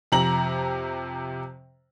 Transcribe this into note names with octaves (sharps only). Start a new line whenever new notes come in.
F2 C3 A#5 F#7